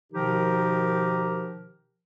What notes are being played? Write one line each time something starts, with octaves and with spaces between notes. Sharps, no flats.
B2 D#3 F3 D#4 G4 A#4